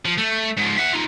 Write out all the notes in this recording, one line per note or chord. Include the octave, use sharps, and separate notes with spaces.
F3
A3
G#2 F3
E5 F#5
D#4 F4